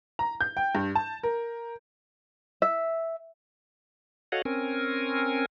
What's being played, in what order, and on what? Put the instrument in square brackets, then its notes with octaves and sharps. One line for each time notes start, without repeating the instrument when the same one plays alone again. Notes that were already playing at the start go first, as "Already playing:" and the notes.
[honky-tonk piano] A#5
G6
G5
G2
A5
A#4
[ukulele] E5
[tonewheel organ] F#4 A4 C#5 D#5 F5 F#5
C4 C#4 A#4 G#5